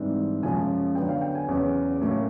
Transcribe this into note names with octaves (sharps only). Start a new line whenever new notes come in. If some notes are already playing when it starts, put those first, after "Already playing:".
Already playing: G#2 E3 G3 C4
F#2 C#3 F3 G#3 C#4 G#5
D3 F#3 B3 G5
F5
G5
G#5
E2 C#3 F#3
A2 F#3 A#3 C#4